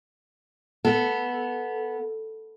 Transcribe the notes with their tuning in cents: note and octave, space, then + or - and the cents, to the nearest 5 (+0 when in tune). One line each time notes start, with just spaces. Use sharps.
B3 -10 A4 +0